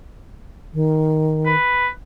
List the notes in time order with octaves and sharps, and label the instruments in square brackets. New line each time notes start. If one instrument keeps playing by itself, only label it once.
[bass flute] D#3
[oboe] B4